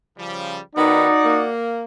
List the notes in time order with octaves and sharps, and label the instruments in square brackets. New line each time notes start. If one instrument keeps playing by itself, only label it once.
[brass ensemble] C#3 F3 G3
[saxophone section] D#3 B3 [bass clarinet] D#4 [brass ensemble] F#4 D5 F#5
[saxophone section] A#3